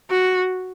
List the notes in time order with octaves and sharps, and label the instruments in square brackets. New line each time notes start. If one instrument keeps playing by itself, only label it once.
[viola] F#4